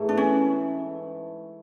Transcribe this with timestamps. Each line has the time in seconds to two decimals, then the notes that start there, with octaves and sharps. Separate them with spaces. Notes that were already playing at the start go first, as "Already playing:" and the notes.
Already playing: G#2 E3 A3
0.09 D4
0.17 C#4